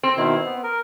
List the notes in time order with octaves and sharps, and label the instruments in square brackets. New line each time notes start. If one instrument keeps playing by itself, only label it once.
[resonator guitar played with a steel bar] C4
[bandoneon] B2 D#3 E4
B3
A#4